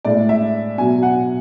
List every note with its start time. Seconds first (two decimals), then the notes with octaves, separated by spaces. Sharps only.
0.05 A2 G#3 D5
0.29 E5
0.78 B2 F#3 G#5
1.03 F#5